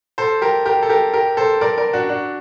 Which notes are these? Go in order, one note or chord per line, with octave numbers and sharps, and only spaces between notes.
A4 C5
G4 A#4
G4 A#4
A4
G4 A#4
G4 A#4
A4 C5
A#4 D5
A#4 D5
D4 F#4
D4 F#4